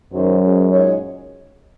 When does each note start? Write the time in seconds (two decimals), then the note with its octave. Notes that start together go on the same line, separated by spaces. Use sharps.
0.13 F#2 D#3 F#3 C#4 G#4 C5
0.42 G#3 C#4 G#4 C5
0.72 A#2 G#3 D#4 G#4 C#5